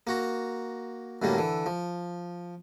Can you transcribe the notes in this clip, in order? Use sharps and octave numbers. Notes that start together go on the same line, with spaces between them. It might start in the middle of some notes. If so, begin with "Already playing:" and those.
A#3 F#4 A#5
F#2 A2 D3 G3 A#3
D3 E3
F3